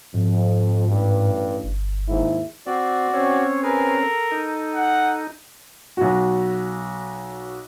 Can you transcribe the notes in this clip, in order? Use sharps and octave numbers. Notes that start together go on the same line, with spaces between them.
F2 G#2
A1 G2
G1
D#2 G#2 E4
C4 F#4 D5
C4 C#4 C#5
G#4 A#4 B4 G#5
A4
D#4
F#5
B1 F#4